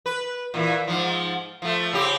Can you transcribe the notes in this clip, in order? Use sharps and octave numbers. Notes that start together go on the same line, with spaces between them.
B4
A#2 E3
G#2 F3
F3 A3
C#3 C4 G4